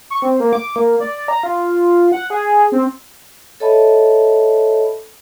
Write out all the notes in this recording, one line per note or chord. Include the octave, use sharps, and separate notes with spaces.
C#6
C4
A#3
D6
A#3
D5
A#5
F4
F#5
G#4
C4
A4 C#5 D#5 E5 A5 B5